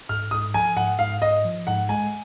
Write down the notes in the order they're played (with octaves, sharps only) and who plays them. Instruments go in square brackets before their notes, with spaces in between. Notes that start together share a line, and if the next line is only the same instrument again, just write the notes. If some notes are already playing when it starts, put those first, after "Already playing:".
[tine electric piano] G#2 [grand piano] F6
[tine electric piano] G#2 [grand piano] D#6
[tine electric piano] F3 [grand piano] G#5
[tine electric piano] G#2 [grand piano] F#5
[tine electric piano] G#2 [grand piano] F5
[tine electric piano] G#2 [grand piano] D#5
[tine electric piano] F3
[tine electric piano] G#2 [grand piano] F#5
[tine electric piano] G#3 [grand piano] G#5